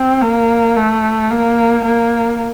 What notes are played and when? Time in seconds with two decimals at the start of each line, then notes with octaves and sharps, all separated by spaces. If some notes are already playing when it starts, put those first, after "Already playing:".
Already playing: C4
0.22 A#3
0.76 A3
1.30 A#3
1.85 A#3